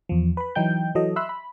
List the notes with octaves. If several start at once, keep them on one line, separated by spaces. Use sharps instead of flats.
E2 F3
B4 B5
E3 F#3 D#4 G5 G6
E3 F#3 A4 D#5
E5 B5 C6 E6 F#6
B5